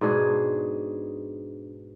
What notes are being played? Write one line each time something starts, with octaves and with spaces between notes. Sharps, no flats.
G#2 B2 D4 G#4